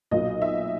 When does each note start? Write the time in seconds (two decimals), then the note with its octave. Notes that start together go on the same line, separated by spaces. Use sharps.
0.11 B1 A#2 F#3 D#5
0.42 E5